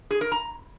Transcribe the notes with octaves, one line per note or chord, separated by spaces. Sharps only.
G#4
A#4
A#5